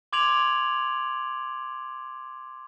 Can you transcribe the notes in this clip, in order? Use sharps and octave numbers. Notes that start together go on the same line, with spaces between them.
C6 D6 G#6 D7 F7 F#7